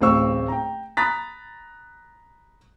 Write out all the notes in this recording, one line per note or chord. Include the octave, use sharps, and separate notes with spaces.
D1 A1 C4 F5 C#6 E6
G5 A#5
A#5 B5 D#6 F#6 A6 B6